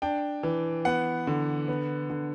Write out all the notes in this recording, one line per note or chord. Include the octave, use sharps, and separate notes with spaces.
D4 G5
E3
B3 F#5
D3
B3
D3